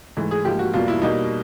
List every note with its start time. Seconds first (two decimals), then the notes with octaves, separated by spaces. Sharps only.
0.17 G#2 E3 A3
0.31 G#4
0.45 G#2 F3 A#3 G4
0.59 F#4
0.74 E2 B2 G3 A#3 F4
0.88 E4
1.02 B2 G3 A#3 D#4